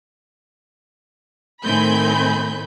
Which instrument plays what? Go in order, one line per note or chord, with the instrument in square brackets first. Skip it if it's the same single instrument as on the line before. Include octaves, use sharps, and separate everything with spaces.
[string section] A2 D#3 C4 G#5 B5 G6